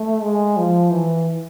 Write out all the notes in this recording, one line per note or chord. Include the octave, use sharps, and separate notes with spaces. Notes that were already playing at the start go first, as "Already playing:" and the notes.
Already playing: A3
G#3
F3
E3